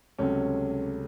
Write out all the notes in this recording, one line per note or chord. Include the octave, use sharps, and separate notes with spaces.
C#2 C3 F#3 A3 C#4